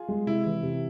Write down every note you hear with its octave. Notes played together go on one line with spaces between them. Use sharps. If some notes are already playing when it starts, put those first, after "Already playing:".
Already playing: F4 G#4
G#3
C3 E4
E3
C3